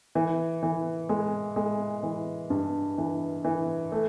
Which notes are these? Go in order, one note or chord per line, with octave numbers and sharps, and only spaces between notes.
E3
E3
G#3
G#3
E3
G2
E3
E3
A3